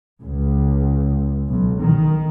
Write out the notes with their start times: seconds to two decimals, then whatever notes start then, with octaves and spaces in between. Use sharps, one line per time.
0.21 C#2
1.49 B1
1.81 D#3